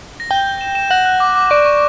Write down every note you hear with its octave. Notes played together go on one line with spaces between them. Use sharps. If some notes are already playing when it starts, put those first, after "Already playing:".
A#6
G5 G6
E7
E7
F#5 A#6
F#6
D6
D6
D5 C#6
C#6